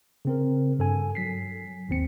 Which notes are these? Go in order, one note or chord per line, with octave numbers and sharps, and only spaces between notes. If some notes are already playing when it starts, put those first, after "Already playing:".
C#3 C4 A#4
G2 A4 G#5
F#3 B6 C7
G#1 D#2 C4 C#7